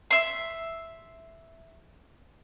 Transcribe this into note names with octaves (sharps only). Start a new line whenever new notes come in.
E5 C6